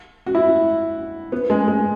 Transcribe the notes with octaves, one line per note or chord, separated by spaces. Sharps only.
F#4
E4
B3
G#3
G#3